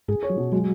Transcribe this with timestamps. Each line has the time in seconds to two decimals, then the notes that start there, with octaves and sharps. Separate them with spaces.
0.08 G#2 G#4
0.23 C#5
0.30 F#3
0.37 B2
0.52 F#3 G#3